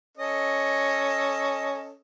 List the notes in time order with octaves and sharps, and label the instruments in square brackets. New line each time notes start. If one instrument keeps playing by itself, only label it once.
[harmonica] C#4 A4 D#5